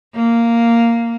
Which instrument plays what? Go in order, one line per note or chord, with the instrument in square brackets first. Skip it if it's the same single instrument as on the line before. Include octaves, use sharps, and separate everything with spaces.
[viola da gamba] A#3